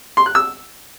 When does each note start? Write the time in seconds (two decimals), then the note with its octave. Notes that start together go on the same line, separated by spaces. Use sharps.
0.17 C6
0.26 F#6
0.35 E6